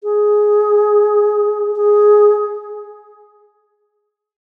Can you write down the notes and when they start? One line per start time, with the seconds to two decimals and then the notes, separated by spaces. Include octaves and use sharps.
0.03 G#4
1.76 G#4